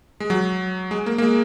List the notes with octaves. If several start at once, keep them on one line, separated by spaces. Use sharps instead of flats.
G#3
F#3
G#3
A#3
A#3
G#3